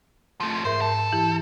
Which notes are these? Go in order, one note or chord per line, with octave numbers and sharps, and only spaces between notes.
F3 A3
G#2 A#4 C5 E5
A4
E3 E4 G4